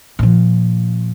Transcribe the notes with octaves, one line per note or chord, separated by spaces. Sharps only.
A#2 F3